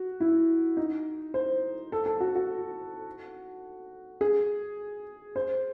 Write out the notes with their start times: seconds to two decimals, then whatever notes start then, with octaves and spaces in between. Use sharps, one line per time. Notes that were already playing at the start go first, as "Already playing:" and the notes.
Already playing: F#4
0.20 E4
0.77 D#4
1.34 C5
1.92 A4
2.06 A4
2.20 F#4
2.35 F#4
4.21 G#4
5.36 C5